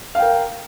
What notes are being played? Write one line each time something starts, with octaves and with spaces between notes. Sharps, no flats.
A#4 F5 G5